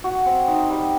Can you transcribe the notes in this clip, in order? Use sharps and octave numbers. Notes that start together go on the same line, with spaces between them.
F#4
C4
D#4
G3